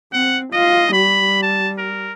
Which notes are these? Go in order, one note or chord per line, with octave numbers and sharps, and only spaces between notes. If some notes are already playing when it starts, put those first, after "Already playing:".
C4 F#5
F4 D#5
G3 B5
A5
A#4